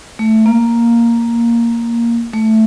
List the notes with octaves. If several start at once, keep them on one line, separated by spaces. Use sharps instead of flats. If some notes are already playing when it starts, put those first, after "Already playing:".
A3
A#3
A3